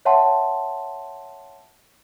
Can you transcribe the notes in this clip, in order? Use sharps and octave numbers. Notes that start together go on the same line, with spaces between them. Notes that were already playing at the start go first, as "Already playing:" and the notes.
C#5 E5 F#5 G5 A5 C6